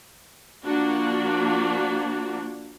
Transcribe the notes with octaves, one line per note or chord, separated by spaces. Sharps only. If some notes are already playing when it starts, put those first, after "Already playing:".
F3 A#3 D4 F#4